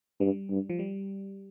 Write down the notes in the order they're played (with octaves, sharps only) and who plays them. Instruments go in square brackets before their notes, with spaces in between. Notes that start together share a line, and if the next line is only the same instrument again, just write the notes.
[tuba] G2 [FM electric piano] G3
[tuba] G2
[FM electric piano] F3
G3